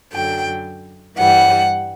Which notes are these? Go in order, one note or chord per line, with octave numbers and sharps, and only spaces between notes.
F#2 D3 F#3 G5
G2 E3 G3 F#5